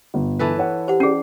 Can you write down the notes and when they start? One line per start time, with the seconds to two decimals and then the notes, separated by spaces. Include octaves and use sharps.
0.14 G1
0.39 E3 A4 B4
0.58 C#5 F#5
0.88 G4 C5 F#5
1.00 C#4 G#4 D5 C7